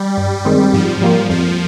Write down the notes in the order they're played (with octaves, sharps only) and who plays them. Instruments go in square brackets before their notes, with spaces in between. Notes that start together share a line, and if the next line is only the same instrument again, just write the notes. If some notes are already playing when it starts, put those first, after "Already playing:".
Already playing: [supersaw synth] G3
[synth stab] G2
D#3 G#3 C4
[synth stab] G#2 [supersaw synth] F3
[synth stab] G3 A#3 F4
[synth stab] F2 [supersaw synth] F3